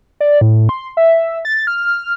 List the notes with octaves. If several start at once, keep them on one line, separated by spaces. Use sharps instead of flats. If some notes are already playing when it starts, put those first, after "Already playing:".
D5
A2
C6
E5
A6
F6